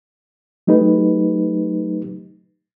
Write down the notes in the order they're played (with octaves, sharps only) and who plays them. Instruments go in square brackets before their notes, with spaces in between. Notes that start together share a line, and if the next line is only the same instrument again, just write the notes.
[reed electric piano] F#3 A3 D#4 G4 B4